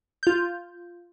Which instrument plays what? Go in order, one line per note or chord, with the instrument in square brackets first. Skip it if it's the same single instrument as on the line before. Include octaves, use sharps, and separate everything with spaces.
[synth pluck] F4 G6